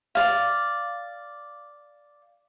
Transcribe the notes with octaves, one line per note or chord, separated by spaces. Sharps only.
D5 F5